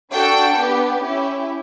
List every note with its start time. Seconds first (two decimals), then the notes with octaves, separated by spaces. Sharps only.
0.12 D4 F#4 A4 G5
0.56 B3 D4 G4
1.01 C#4 E4 G4